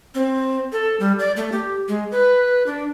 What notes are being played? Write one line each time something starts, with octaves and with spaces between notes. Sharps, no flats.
C4
A4
G3
D5
A3
G4
G#3
B4
D4